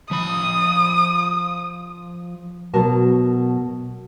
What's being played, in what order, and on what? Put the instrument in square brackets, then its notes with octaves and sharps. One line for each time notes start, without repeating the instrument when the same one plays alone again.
[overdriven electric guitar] F3 B5 [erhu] D#6
[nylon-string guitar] B2 F#3 F#4 A#4 A5